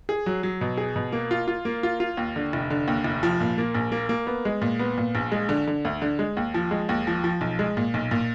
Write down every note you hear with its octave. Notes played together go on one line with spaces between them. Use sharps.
G#4
F#3
F#3
B2
G#4
B2
A#3
F4
F4
A#3
F4
F4
D#2
D3
F1
D3
D#2
F1
F3
A#2
A#3
A#1
A#3
A#3
B3
G#3
A#2
B3
A#2
A#1
G#3
D3
D3
D2
D3
G#3
D#2
F3
G#3
D#2
F3
F3
B1
G#3
A#2
B1
A#2